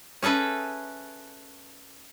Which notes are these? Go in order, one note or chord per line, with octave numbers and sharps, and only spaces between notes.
C#4 G#4 A4 B4 E5